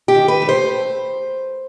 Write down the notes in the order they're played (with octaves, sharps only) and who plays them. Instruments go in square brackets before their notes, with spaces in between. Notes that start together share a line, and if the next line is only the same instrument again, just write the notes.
[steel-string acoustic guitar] G4
D#3
B4
A3
C5